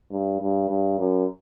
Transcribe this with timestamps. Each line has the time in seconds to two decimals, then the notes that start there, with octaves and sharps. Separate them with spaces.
0.12 G2
0.41 G2
0.69 G2
0.99 F#2